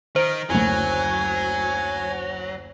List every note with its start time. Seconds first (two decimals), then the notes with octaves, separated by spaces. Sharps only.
0.16 D#3 C5 A#5 D7
0.50 F#1 D2 F#3 G#5